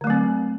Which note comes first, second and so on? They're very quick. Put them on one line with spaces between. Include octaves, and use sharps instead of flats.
D3 A3 F#3 C4